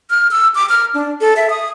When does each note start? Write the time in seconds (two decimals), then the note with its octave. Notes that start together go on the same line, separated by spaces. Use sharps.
0.10 F6
0.31 E6
0.55 D6
0.69 F6
0.94 D4
1.21 A4
1.37 E5
1.50 D#6